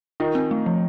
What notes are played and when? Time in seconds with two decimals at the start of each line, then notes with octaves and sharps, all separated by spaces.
0.20 D#3 D#4 F4
0.35 C4
0.51 A3
0.66 F3